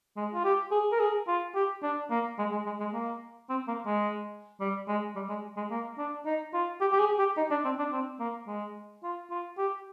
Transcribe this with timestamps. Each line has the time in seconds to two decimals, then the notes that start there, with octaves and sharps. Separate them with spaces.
0.17 G#3
0.34 F4
0.45 G4
0.72 G#4
0.92 A#4
1.00 G#4
1.28 F4
1.55 G4
1.83 D4
2.11 A#3
2.39 G#3
2.52 G#3
2.66 G#3
2.80 G#3
2.93 A#3
3.50 C4
3.68 A#3
3.86 G#3
4.60 G3
4.88 G#3
5.16 G3
5.29 G#3
5.57 G#3
5.71 A#3
5.98 D4
6.26 D#4
6.54 F4
6.81 G4
6.92 G4
7.00 G#4
7.19 G4
7.37 D#4
7.51 D4
7.65 C4
7.79 D4
7.93 C4
8.20 A#3
8.47 G#3
9.03 F4
9.31 F4
9.58 G4